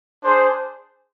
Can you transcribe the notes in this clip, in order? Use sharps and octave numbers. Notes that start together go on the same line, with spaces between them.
D4 G#4 C5